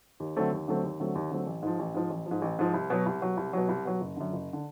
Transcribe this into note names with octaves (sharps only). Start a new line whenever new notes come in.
D#2
D3 F#3 A3 C4
D#2
D3 F#3 A3 C4
D#2
D3 F#3 A3 C4
D#2
D3 F#3 A3 C4
A1
G#2 F3
A1
G#2 F3
A1
F3
G#2
A1
G#2 F3
C2
B2 F#3
C2
B2 F#3
C2
B2 F#3
C2
B2 F#3
F#1
F#2 D3
F#1
D3